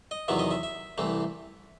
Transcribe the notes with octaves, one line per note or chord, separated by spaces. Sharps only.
D#5
E2 C3 D#3 F#3 B3 E5
D#5
E5
E5
C2 C3 E3 A3 C4